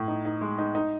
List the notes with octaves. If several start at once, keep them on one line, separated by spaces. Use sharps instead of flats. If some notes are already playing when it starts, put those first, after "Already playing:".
Already playing: A2
D#4
D#4
G#3
D#4
D#4